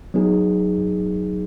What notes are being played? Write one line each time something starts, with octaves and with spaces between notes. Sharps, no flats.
F#3 B3 D#4 G#4